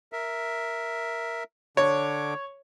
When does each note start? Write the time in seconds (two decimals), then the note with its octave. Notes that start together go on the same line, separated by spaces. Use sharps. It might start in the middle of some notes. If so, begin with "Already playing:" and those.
0.12 A#4 E5
1.77 D3 D4 C#5 D6